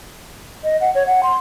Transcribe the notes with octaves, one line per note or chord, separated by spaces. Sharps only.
D#5
F#5
C#5
F#5
C6